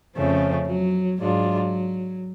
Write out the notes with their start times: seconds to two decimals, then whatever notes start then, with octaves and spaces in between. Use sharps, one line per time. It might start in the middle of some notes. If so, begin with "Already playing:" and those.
0.16 F2 C#3 F3 A3 C#4
0.69 F#3
1.21 G#2 F#3 G#3 D4 F4